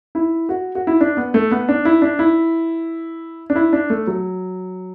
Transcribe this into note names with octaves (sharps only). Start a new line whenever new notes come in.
E4
F#4
F#4
E4
D4
B3
A3
B3
D4
E4
D4
E4
D4
E4
D4
A3
F#3